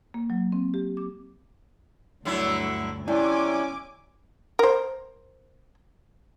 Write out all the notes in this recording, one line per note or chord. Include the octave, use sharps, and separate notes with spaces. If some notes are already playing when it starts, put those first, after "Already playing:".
A#3
F#3
C4
G4
D6
D2 G2 D3 F#3 E4
C3 C#4 E4 D5 G#5 D6
A#4 C5